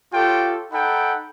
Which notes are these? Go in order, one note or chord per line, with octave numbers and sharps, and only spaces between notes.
F4 G4 A4 C#5 G5
D#4 A4 F#5 G5 B5